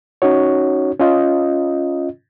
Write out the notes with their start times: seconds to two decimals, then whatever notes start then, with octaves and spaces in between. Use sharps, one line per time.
0.22 C#4 D#4 F#4 C#5
1.00 C#4 F4 D#5